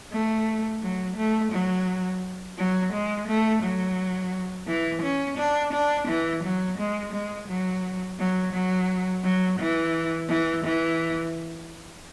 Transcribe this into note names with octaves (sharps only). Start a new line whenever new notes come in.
A3
F#3
A3
F#3
F#3
G#3
A3
F#3
E3
C#4
D4
D4
E3
F#3
G#3
G#3
F#3
F#3
F#3
F#3
E3
E3
E3